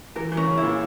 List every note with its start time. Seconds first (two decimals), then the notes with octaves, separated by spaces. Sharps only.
0.16 E3 A#4
0.32 E3
0.37 C#4
0.47 C#3
0.57 E4
0.63 A#2